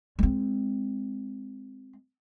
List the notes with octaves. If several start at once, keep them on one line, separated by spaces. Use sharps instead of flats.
G#3 C4